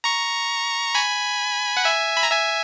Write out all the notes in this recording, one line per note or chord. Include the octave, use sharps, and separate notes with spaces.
A#5 C#6
G#5 B5
F#5
E5 G#5
B5
A#5
E5 G#5